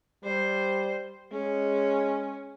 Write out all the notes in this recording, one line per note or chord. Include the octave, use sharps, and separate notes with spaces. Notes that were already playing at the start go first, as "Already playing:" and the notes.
G3 C5
G#3 C#4